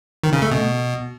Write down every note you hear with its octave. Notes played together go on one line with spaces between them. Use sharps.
D#3
C#3
A3
B2